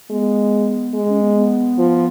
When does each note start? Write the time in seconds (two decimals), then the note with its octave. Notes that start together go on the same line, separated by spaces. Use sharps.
0.10 G#3 B3
0.94 G#3
1.08 C#4
1.22 B3
1.36 B3
1.78 F3